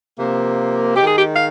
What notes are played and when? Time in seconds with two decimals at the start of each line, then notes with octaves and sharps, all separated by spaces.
0.17 C3 F3 A#3
0.96 D#3 G#3 G4
1.07 G#4
1.17 G4
1.35 F5